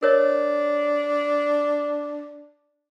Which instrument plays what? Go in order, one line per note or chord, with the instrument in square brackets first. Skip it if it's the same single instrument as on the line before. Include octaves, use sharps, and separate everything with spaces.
[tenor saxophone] D4 [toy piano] A#4 C#5 D#5